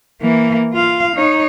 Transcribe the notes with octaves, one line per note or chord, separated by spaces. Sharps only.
E3 A#3
F4 F5
D#4 C#5